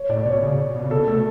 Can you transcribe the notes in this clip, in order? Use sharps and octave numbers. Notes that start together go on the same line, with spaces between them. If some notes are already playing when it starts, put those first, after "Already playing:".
Already playing: C#5
A2 D5
B2 C#5
C#3
B2
C#3
B2 A4
A3 A4